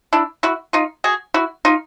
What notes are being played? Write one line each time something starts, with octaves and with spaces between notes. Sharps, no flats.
D4 E4
E4 F#4
D#4 F4
F#4 G#4
E4 F#4
D#4 F4